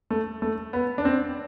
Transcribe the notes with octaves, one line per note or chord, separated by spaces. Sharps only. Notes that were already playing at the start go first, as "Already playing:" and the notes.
A3
A3
B3
D4
C4